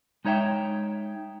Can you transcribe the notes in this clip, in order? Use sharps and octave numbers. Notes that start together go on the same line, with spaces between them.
G#3 D#4 C#5 E5 G5